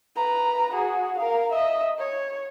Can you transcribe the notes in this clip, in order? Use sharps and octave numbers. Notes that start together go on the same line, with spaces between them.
B4 A#5
F#4 G#4
A#4 F5
D#5 E5
C#5